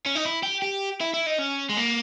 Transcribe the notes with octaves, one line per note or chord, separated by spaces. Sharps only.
C#4
D#4
E4
G4
G4
E4
E4
D#4
C#4
G#3
A#3